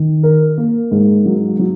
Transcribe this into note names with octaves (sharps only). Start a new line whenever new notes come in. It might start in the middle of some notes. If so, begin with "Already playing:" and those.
Already playing: D#3
A#4
A#3
G#2
F#3
F#3